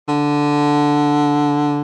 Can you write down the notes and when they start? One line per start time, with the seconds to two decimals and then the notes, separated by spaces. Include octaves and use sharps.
0.09 D3